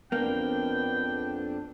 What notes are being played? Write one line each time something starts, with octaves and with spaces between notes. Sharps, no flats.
F2 A#3 B3 D4 G5